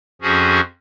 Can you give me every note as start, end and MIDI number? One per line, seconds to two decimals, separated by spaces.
0.22 0.60 41
0.22 0.60 53
0.22 0.60 61
0.22 0.60 66
0.22 0.60 68